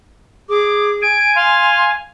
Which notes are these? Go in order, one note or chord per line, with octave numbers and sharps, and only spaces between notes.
G#4 D6
G#5 D7
F5 C6